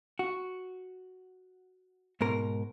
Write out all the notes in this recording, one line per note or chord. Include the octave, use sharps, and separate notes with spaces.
F#4
G#2 B2 A#4